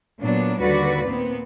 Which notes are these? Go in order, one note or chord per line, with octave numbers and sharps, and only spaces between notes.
A#2 F#3 B3 D4
D#2 D3 G3 F#4 B4 D5
A#2 B3 C4